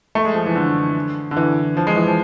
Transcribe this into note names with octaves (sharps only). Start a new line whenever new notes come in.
A3
G#3
F3
E3
D3
D3
E3
F3
G#3
E3
F3